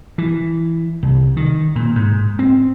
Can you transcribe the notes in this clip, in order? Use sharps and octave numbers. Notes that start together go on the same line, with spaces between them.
E3
C2
D#3
A#2
G#2
C4